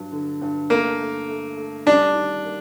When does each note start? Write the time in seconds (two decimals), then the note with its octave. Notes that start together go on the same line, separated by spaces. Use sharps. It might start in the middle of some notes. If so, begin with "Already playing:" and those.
Already playing: G2 F#3
0.12 D3
0.42 G2
0.70 A3 A#3
0.99 A3
1.29 A3
1.57 A3
1.86 G3 D4
2.15 D#3
2.44 A#3